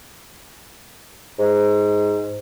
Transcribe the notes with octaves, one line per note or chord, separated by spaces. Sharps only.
G#2